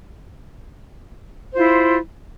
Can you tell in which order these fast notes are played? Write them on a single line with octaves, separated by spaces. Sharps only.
C5 F4 E4